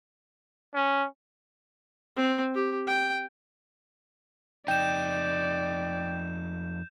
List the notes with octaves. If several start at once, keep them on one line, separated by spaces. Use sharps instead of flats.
C#4
C4
G4
G5
F2 D#4 D5 G5 G6 E7